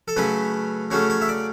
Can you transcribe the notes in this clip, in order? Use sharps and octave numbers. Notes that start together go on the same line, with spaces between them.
A4
C#3 F#3 A3 C#4 B4
C#3 F#3 A3 C#4 C#5
C#5
E5
D5